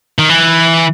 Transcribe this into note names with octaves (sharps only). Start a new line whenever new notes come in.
D#3
E3